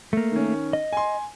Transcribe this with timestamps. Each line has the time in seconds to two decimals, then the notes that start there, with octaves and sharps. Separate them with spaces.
0.13 A3 A#3
0.32 D#3 C#4
0.73 D#5
0.93 G#5 C6